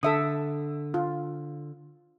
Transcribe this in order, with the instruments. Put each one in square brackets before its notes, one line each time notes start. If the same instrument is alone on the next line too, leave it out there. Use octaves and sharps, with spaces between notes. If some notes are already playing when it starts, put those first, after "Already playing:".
[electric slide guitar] D3 [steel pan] A4 E5 D#6
[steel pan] F4